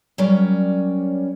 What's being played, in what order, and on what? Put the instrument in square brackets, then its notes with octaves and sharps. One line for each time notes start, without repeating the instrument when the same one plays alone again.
[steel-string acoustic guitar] F#3 G3 C#4 A#4 C#5 D5